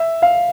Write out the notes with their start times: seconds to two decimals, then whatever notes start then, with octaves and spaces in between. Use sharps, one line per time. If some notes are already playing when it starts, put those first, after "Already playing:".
Already playing: E5
0.22 F5